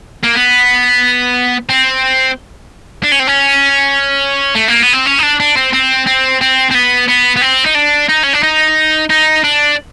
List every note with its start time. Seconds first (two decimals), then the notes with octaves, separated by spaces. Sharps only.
0.23 A#3
0.35 B3
1.69 C4
3.03 D4
3.12 C#4
3.20 C4
3.27 C#4
4.55 A3
4.68 A#3
4.81 B3
4.93 C4
5.06 C#4
5.19 D#4
5.23 D4
5.40 D4
5.57 C4
5.73 C4
6.07 C4
6.41 C4
6.70 C4
6.74 B3
7.08 B3
7.36 B3
7.42 C4
7.66 D#4
7.75 D4
8.09 D#4
8.24 C#4
8.33 D4
8.43 D#4
9.10 D#4
9.44 D4